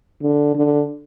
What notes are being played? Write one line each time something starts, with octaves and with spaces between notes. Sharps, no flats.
D3
D3